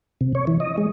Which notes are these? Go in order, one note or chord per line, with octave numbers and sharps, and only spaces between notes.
C3
C#5
E3
D#5
G#3